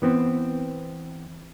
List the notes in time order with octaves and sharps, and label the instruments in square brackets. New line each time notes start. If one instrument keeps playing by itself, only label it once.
[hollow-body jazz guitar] E3 B3 C4